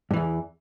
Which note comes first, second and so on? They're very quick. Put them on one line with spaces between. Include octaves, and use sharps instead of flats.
G2 E3 E2